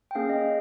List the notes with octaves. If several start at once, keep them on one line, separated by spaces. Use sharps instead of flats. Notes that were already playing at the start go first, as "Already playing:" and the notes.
G5
A#3 C#4 G#4 F5
D#5